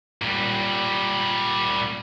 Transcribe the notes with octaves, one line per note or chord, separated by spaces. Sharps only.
A#2 G3